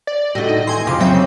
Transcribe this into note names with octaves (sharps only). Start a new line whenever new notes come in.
D5
A2 D3 G3 F#4 D#5
D#4
D#2 E3 G5 G#5 C6
F2 C#3 F4 D6
F#3 C4 C#4 E5 G5